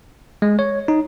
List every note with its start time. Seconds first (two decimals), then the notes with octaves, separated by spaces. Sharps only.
0.42 G#3
0.59 C#5
0.88 D#4